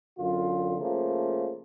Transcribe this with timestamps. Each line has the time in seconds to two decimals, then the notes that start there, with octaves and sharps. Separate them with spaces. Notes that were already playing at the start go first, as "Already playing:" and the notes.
0.18 F#2 D3 F4
0.78 C#3 F3 A3 A#3